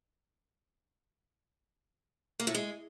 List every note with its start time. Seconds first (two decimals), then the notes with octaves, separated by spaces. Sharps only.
2.40 A#3
2.47 A2
2.54 G#3